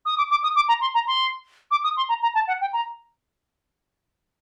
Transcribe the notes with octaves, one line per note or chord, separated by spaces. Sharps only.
D#6
D6
D6
D#6
D6
A#5
C6
A#5
C6
D6
D#6
C6
A#5
A#5
A5
F#5
G5
A#5